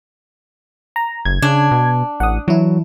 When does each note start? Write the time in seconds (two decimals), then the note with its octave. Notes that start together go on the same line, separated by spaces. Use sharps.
0.96 A#5
1.25 F#1 G#6
1.42 C#3 D4
1.71 B2
2.20 A1 F#5 D#6
2.48 E3 F#3 E4